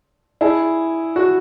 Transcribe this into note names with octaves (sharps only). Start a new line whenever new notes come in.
E4 G#4
F#4